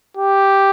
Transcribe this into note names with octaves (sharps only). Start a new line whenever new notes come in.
G4